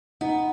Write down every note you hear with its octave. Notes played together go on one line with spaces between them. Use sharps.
B3 D#4